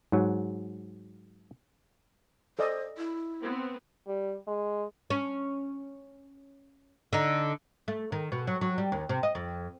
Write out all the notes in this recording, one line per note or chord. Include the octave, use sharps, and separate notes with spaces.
G#2 F#3
A4 C5 D5 D#5
E4
B3 C4
G3
G#3
C#4
D3 D#4
A3
D#3
B2
F#3
F#3
G3
D#2
C3
D#5
F2